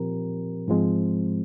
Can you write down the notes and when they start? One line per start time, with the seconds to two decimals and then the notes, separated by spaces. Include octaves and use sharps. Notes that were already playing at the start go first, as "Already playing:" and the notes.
Already playing: A#2 F3 C4 G4 A#4
0.68 G#2 F3 G#3 C4